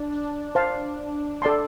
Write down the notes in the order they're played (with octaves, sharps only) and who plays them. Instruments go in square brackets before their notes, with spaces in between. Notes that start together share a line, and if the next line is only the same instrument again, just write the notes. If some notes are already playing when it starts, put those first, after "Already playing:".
Already playing: [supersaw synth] D4
D4
[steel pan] C5 F5 A5
A4 D5 A5 C6